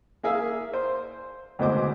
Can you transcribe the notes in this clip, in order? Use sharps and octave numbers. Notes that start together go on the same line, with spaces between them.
A#3 G#4 E5 F5
C5
D2 B2 G#3 C5 D6